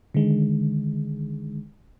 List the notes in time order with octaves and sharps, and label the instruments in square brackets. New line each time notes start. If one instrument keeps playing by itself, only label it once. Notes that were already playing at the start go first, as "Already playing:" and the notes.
[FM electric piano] D3 D#3 G#3